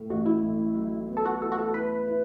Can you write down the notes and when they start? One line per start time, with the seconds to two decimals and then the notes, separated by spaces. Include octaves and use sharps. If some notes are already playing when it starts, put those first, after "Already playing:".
Already playing: A2
0.09 A1 F#4
0.26 E4
0.42 A1
0.75 F#3
1.08 B3
1.17 A4
1.25 F#4
1.41 E4 A4
1.52 F#4
1.58 A4
1.74 E4 B4
2.07 E4